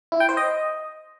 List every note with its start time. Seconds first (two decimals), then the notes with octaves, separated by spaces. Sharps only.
0.12 E4
0.20 G5
0.29 C5
0.37 D#5